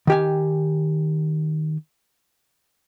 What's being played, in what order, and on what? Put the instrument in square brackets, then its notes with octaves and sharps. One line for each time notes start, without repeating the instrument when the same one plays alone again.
[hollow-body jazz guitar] D#3 G4 G#5